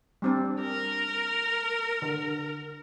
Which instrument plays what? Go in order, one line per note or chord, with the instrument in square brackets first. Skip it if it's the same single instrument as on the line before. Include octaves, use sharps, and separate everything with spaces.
[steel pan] G3 C4 D4
[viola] A#4
[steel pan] D3